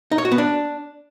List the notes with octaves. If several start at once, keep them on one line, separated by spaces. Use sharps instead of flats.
D#4
C#5
F#4
B3
D4